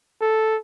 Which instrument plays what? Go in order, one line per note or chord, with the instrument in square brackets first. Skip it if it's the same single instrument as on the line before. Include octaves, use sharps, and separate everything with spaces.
[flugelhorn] A4